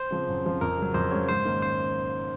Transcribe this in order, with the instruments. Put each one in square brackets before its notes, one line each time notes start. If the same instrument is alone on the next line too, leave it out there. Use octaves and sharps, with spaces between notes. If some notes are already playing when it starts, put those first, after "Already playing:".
Already playing: [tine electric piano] C5
[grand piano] C#3 F3 C4
F#2
C#3 F3 C4
[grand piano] F2 [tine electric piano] A#4
[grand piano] C#3 F#3
[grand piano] F2 [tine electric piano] C5
[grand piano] C#3 F#3 [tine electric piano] C#5
[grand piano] G#2 [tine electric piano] C5
[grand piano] D#3 A#3 C#4
[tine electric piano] C5